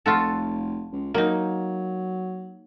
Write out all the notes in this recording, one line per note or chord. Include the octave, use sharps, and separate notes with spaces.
F1 F4 F#4 A4
C#2
F#3 A#3 D#4